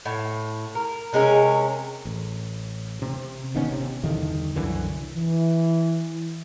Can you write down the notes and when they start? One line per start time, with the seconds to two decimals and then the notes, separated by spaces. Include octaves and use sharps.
0.05 A2
0.75 A#4
1.13 C3 G#3 C#4 A#4
2.05 A1
3.02 C3 C4
3.55 G#1 D#3 B3 C#4
3.72 C3
4.03 E2 G2 D3 D#3
4.54 C2 F#2 D3 E3
5.15 E3